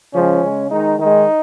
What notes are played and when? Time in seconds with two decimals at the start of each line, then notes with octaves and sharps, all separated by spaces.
0.14 C#3 F3 G#3 C#4
0.42 C#3 G#3
0.69 D#3 G#3 D#4
0.98 D#3 G#3 D#4